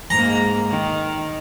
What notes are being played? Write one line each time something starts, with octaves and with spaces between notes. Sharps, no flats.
G#2 G#3 A#3 A#5
D#3